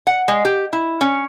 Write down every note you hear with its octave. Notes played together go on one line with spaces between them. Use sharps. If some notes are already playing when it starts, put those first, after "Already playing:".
F#5
G#3
G4
E4
C#4